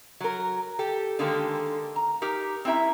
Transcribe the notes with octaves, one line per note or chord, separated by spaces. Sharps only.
F#3 A#4
G4 A4
D3 D#3 G#3 A#3 G4 A4
A#5
D#4 G4 A#4
C4 C#4 E4 E5 A#5